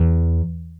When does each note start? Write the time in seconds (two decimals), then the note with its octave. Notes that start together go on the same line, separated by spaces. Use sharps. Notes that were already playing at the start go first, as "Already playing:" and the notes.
Already playing: E2